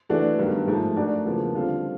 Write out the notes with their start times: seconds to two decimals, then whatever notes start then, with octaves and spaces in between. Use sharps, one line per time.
0.09 E3 A3 D4 F#4 A4
0.39 G2 D#3 G3 B3
0.67 G#2 F3 A3
0.96 A3 D4 F#4 A#4 D5
1.25 E2 C#3 F3 A#3
1.55 D3 G3 C4 F4 A4